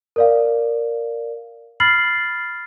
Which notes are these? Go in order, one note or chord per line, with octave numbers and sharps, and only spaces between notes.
A#4 D5 F5
B5 F6 A6 C7 F#7